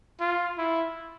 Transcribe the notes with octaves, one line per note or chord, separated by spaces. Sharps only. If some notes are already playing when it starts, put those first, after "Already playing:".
F4
E4